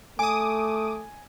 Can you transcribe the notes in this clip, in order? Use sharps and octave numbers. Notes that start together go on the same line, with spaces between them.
A3 G#5 D6 D#6